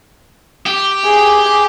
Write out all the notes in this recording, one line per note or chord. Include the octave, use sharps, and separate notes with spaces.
G4
G#4